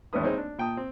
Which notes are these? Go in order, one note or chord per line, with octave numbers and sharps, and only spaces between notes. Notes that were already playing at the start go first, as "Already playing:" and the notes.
G#1 E2 C#4 D4 B4 D#6
G#3 C4 D#4 C5 C#5
D4
A#2 G5 A5 D#6
C4